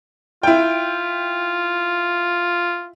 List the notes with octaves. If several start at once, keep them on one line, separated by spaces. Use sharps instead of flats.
E4 F4 G5